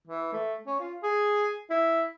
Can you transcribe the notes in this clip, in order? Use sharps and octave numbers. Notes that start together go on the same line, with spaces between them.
E3
A3
C#4
F4
G#4
E4